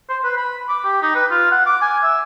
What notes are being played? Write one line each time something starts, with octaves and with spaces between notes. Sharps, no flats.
C5
B4
B5
D6
G4
D#4
B4
F4
F#5
D6
G#5
E5